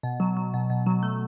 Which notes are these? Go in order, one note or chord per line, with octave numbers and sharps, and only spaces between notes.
B2
F#3
F#3
B2
B2
F#3
A3